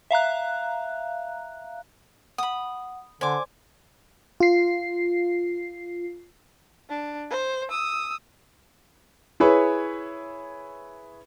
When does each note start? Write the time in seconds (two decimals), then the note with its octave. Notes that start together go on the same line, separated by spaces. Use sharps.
0.11 E5 F5 A#5 F#6
2.38 F#5 B5 D#6
3.21 D3 C5 D5 G#5 C6 D6
4.40 F4 C7
6.90 D4
7.31 C5
7.70 D#6 E6
9.40 E4 G#4 B4 C#5